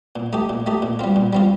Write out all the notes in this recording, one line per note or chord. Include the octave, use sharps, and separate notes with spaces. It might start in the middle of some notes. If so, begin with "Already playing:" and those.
A#2
A3 D#4 G4
A#2
A3 D#4 G4
A#2
G3 C4 F4
A#2
G3 C4 F4